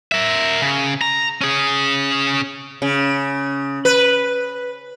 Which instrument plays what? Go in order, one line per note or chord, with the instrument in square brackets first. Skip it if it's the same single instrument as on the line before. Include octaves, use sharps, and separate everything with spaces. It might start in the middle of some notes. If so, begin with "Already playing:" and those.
[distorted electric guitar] A#4 E5
C#3
A#5
C#4 G#4
[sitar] C#3
B4